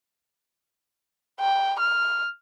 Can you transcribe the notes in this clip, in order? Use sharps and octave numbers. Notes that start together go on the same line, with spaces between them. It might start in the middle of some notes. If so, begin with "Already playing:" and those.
G5
F6